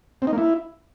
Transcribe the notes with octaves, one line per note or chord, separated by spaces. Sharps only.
C4
D#4
A#3
E4